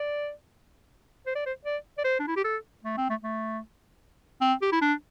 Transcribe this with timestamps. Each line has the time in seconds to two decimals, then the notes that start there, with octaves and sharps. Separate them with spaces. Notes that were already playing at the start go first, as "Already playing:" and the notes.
Already playing: D5
1.26 C5
1.35 D5
1.46 C5
1.65 D5
1.98 D5
2.04 C5
2.19 D4
2.27 E4
2.36 G4
2.44 A4
2.84 A3
2.97 C4
3.09 A3
3.23 A3
4.41 C4
4.62 G4
4.72 E4
4.81 D4